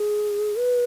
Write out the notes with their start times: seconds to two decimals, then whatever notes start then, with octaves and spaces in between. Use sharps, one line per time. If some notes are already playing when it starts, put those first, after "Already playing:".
Already playing: G#4
0.56 B4